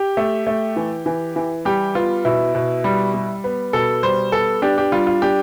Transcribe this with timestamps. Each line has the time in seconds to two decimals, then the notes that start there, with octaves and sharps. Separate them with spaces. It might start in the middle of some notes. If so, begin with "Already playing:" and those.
Already playing: G4
0.17 A3
0.47 A3
0.76 E3
1.06 E3
1.36 E3
1.65 G3 G4
1.95 B3 F4
2.25 B2 E4
2.55 B2
2.84 G3
3.14 G3
3.44 B3
3.73 B2 A4
4.03 G3 C5
4.32 B3 A4
4.62 D4 G4
4.78 G4
4.92 G3 F4
5.07 F4
5.22 D4 G4